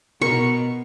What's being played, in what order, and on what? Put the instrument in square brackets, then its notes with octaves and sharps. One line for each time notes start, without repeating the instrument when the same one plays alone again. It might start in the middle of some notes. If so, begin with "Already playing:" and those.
[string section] B2 [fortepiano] A#4 [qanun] C#6